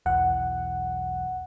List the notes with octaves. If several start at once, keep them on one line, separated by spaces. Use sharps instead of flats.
B1 E2 F#5